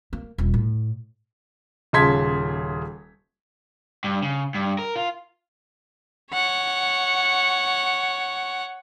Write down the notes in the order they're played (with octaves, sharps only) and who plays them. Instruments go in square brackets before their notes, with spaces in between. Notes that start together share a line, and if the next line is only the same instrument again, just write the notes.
[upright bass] A#3
D#1
A2
[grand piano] D#1 C#3 A5 C6 G#6 B6
[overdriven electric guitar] G2
C#3
G2
A#4
F4
[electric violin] C#5 F#5